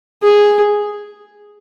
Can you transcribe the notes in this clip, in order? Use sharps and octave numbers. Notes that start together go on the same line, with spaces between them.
G#4